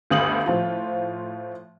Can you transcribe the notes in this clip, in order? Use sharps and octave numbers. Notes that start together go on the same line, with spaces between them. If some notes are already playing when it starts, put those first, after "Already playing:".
G1 D2 F5 D#6 F#7
A2 F3 F4